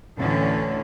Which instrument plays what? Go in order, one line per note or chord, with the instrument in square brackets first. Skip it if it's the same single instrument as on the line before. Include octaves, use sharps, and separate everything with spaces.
[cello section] D2 A2 D3 E3 C#4